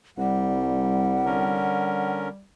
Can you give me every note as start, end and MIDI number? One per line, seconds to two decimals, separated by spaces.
0.18 1.67 36
0.18 2.44 55
0.18 2.18 78
1.25 2.28 50
1.25 2.28 61
1.25 2.28 70